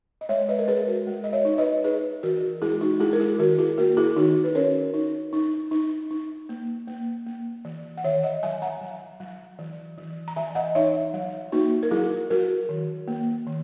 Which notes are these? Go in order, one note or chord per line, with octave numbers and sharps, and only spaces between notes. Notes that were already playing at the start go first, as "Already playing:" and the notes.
D#5
G#3 C#5 E5
B4 D#5
A#4
G#3 G#4 B4
F#4 A#4
G#3
D#5
C#5 E5
D#4
B4 D#5
D#4 G#4 B4
E3 F#4 A#4
G#3 E4 G#4
D#4 F#4
G#3 E4 G#4
A#4
E4 G#4
D#3 F#4 A#4
E4 G#4
A#3 F#4 A#4
E4 G#4
D#3 D#4 F#4
B4
C#4 A#4 C#5
D#4
D#4
D#4
D#4
A#3
A#3
A#3
E3
F#5
D#3 C#5 E5
D#5 F#5
F#3 E5 G#5
F#5 A#5
F#3
F#3
E3
E3
A#5
E3 E5 G#5
D#5 F#5
D#4 C#5 E5
F#3
A#3 D#4 F#4
A#4
F#3 E4 G#4
F#3 F#4 A#4
D#3
A#3
D#3